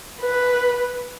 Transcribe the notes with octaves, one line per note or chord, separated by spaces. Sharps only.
B4